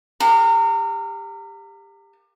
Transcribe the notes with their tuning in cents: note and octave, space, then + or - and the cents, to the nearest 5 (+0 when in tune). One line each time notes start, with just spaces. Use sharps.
G4 +25 A#4 -30 F5 +25